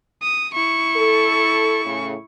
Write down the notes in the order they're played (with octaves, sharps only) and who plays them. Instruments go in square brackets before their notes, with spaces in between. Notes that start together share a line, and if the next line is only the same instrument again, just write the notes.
[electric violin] D#6
E4 C#6
[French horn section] A4
A2 C#3